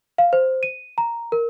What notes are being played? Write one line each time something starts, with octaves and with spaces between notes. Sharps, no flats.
F5
C5
D#7
A#5
A#4